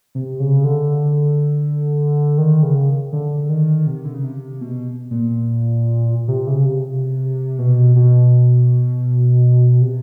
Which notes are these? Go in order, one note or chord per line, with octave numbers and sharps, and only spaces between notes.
C3
C#3
D3
D#3
C#3
D3
D#3
C3
D3
C#3
C3
B2
A#2
C3
C#3
C3
B2
B2
C3